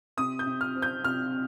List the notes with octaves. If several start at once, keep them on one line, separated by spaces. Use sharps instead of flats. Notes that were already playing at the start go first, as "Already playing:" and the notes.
C3 D#6
G6
C3
F6
C4
G6
C3 F6